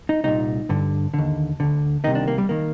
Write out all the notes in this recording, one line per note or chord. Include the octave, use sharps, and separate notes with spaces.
D#4
C2 A#2 D#4
G2 D3
D#2 D3
D2 D3
C2 C3 D#3 D#4
D4
A#3
G3
D#3 A#3